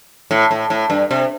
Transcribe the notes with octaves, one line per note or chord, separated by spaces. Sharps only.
A2
A2
A2
G2
C3